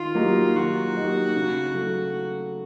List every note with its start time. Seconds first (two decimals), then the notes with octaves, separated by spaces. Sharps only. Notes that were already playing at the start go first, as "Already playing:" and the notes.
Already playing: D#3 F4
0.15 F#3 A#3 D#4 G4
0.55 D#3 F#4
0.95 F#3 A#3 D#4 G4
1.35 C#3
1.74 F#3 A3